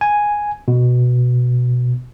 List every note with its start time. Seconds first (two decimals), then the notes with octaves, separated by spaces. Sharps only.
0.01 G#5
0.68 B2